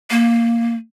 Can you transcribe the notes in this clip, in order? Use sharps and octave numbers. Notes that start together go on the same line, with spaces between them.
A#3